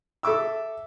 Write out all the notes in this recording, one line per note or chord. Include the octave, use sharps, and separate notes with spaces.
A4 E5 D6 E6